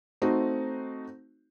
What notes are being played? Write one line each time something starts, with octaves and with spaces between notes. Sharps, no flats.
A3 C4 D#4 F#4